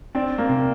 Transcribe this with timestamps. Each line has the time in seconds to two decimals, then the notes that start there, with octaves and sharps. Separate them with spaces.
0.15 C4 D4
0.38 A#3
0.49 C3